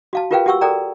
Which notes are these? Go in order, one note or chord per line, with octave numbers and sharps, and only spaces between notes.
F#4 F5 A5
F4 G4 A#4 B4 F5 G5
F#4 G4 F#5 C#6 E6
A4 A#4 D5 G5 A#5